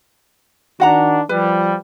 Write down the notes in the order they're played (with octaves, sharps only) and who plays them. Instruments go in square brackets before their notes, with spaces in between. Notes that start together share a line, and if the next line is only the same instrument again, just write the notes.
[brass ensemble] D#3 D4 [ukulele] F#4 F#5 A#5
[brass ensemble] F3 G3 [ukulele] B4